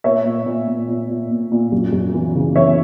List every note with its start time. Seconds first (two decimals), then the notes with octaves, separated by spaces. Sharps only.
0.04 A#2 C#5 E5
0.25 A#2
0.46 A#2
0.68 A#2
0.88 A#2
1.09 A#2
1.31 A#2
1.52 A#2
1.72 F#2
1.93 F#2
2.14 E3
2.35 C#3
2.56 E3 C#5 E5